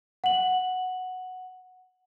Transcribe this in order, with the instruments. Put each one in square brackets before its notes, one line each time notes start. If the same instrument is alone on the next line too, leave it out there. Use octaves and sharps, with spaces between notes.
[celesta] F#5 F#7